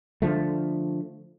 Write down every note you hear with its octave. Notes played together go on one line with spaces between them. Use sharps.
D3 F3 A3